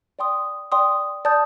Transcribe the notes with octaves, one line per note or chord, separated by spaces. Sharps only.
D5 G5 C6 D#6
D5 G5 C6 D#6
D5 A5 D#6 G6